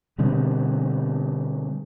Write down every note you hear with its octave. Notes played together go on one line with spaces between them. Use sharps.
B2 D3 G3 C4